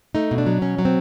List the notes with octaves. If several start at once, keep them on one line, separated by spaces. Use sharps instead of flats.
A3 D#4
B2
D4
F#3
B2 C#4
F#3
C4